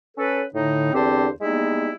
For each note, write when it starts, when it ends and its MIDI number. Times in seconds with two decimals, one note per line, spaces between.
0.17 0.42 61
0.17 0.42 69
0.17 0.42 71
0.54 0.90 45
0.54 0.90 50
0.54 0.90 63
0.92 1.29 40
0.92 1.29 50
0.92 1.29 60
0.92 1.29 62
0.92 1.29 67
0.92 1.29 72
1.41 1.91 55
1.41 1.91 56
1.41 1.91 58
1.41 1.91 59
1.41 1.91 63
1.41 1.91 64